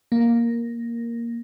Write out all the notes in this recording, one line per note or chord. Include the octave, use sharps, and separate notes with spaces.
A#3